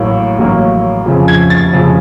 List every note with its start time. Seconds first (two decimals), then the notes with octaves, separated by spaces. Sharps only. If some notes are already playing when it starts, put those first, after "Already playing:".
Already playing: A1 A2 F#3 A#3
0.38 A1 A2 F#3 A#3
1.06 F2 C#3 F3
1.28 G#6
1.50 A6
1.73 F2 C#3 F3